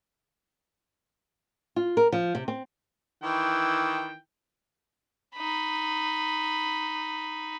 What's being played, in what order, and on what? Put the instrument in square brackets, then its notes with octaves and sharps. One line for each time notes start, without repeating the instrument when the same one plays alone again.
[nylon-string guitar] F4
A#4
F3
C3
C4
[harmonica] D#3 E3 G5
[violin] D#4 B5